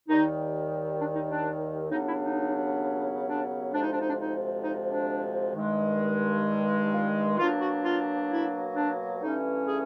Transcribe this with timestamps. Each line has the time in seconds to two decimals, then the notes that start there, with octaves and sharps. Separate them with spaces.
0.08 D#2 D#3 G3 D#4
0.99 D4
1.15 D#4
1.30 D4
1.90 D#2 C#3 F#3 B3 D4 D#4
2.05 E4
2.21 D#4
3.27 D4
3.72 D2 C3 F3 G#3 D4
3.81 D#4
3.91 D4
3.99 D#4
4.08 D4
4.19 D#4
4.63 D#4
4.87 D4
5.55 G2 D#3 G#3
6.92 F4
7.38 B2 F#3 A#3 D4 F4
7.60 F#4
7.82 F4
8.29 E4
8.75 D4
9.20 G2 E3 A3 C#4 D#4
9.65 G#4